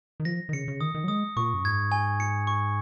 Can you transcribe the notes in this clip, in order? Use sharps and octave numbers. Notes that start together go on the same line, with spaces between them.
D#3
F3 A#6
D#3
C#3 C#7
C#3
D#3 D#6
D#3
F#3
G#3 D#6
A#2 C#6
F#2
G#2 G#6
G#5
C#7
C#6